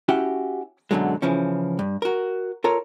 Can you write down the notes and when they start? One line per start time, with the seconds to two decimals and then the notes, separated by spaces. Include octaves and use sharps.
0.08 C#4 E4 F#4 G4 F#5 G5
0.91 F#2 B2 D3 F#3 G#3
1.22 C#3 E3 F3 C#4
1.79 G2
2.02 F#4 A#4
2.64 F4 A4 A#4 C#5